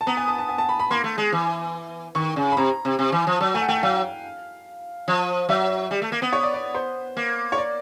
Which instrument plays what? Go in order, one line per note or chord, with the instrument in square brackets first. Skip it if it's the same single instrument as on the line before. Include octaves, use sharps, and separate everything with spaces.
[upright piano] A5
[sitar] B3 [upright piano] A#5
[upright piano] G#5
A5
A5
G#5
A5
B5
B5
[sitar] A#3 [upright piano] C6
[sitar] A3
G#3
E3
[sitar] D#3 [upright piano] C#6
[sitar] C#3
[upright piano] B5
[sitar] C3 [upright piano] A#5
[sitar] C3
C3
E3
F3
[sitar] F#3 [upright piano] A5
[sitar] A3 [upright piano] G#5
[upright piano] F#5
[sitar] A3 [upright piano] G5
[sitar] F#3 [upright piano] F5
[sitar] F3
[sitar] F#3 [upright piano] E5
[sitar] G3
A3
A#3
B3
[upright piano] C#5
D5
D5
C5
[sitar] A#3
[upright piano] C#5
D5